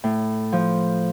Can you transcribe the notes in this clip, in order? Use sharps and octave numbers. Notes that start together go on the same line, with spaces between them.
A2
F3